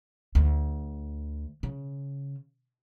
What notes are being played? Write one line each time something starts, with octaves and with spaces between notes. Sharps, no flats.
D2
C#3